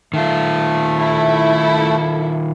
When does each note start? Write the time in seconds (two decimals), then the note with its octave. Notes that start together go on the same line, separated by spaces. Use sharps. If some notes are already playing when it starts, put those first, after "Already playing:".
0.14 D#3 A3 F4
0.99 E4 A4